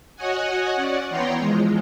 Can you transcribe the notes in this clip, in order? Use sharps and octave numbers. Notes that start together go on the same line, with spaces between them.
F#4 C#5 D#5 F#5 G#5
C#4 D5 F#5
E3 B3 C#5 G5 A#5 C6
E2 F3 G#3